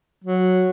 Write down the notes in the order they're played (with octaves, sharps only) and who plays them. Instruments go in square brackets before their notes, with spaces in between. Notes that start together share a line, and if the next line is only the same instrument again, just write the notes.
[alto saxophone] F#3